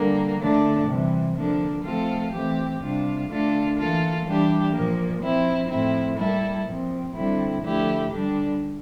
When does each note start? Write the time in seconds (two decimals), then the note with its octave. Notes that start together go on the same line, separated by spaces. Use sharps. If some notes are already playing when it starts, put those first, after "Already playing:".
Already playing: D3 G3 A#3
0.40 D3 A3 D4
0.88 C3 E3 G3
1.36 D3 F3 A#3 D4
1.84 F3 A3 C4 F4 A4
2.32 E3 A3 C4 G4
2.81 C3 G3 D4 F4
3.28 D3 A3 D4 F4 A4
3.77 E3 A#3 F4 A4
4.25 E3 G3 D4 G4
4.73 A#2 F3 A#3
5.21 F3 C4 E4
5.69 A2 F3 C4 E4
6.17 G3 A#3 E4 A4
6.66 A#2 F3 C4
7.14 D3 G3 C4 E4
7.62 D3 F3 A3 E4 G4
8.10 D3 G3 D4